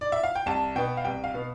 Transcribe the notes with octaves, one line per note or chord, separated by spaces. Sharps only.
D5
E5
F5
G5
C2 A5
B2 B3 G5
F5
C2 G5
F5
B2 B3